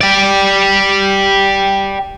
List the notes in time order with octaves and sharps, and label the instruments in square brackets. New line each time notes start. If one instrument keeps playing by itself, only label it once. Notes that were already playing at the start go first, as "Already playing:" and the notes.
[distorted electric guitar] G4 D5